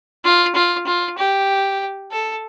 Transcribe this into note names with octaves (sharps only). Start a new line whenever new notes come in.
F4
F4
F4
G4
A4